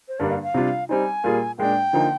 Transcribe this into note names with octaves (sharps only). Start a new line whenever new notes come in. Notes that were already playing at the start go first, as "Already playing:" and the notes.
C5
G2 D3 G3 A#3 D4 D5
F5
F5
C3 G3 D4 F4
G3 C4 D#4 G#5
A#2 G3 A#3 F4 G#4
A#2 G#3 D4 G5
D3 F3 A#3 D#4